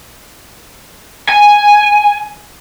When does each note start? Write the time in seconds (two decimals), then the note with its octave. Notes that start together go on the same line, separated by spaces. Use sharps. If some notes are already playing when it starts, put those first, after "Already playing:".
1.29 G#5